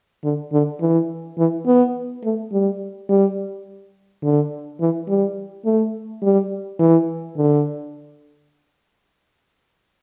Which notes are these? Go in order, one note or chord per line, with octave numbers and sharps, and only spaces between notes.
D3
D3
E3
E3
B3
A3
G3
G3
D3
E3
G3
A3
G3
E3
D3